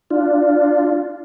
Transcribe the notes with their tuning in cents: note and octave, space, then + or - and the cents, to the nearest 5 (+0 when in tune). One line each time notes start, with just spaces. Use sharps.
D4 +0 F4 +0